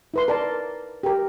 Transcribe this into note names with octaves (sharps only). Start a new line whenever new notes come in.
E4 B4 C6
A#4 D5 A5
G4 A#4